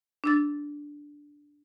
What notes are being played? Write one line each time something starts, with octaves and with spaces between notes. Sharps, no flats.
D4 E6 A6